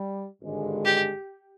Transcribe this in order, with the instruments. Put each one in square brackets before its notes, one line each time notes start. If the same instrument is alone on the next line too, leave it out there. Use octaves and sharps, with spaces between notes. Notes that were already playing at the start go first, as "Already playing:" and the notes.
Already playing: [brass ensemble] G3
G#1 G2 D3 G#3
[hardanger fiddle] G4